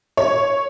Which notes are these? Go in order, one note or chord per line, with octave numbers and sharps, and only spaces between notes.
C#5